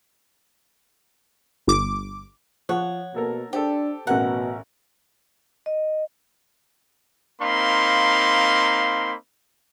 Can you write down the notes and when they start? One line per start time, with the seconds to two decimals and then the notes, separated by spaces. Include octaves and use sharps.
1.67 G1 D6
2.69 F3 C#5 F#5
3.15 B2 A#3 A4 A#4
3.53 D4 G4 A4 C5
4.07 A1 B2 A#4 F#5
5.66 D#5
7.41 A#3 C4 D#4 F5 B5 C6